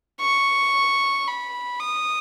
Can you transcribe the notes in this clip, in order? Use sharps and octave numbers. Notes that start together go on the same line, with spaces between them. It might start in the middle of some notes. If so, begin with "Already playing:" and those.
C#6
B5
D#6